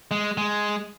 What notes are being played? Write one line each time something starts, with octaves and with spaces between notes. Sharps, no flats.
G#3
G#3